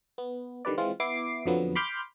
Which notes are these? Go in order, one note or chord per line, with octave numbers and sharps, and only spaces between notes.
B3
D3 D#3 G3 B4 D5
E3 G#3 C4 F4
B3 E4 D6 C7
F2 D3 F3 F#3 B3
B5 C6 D6 F6 G6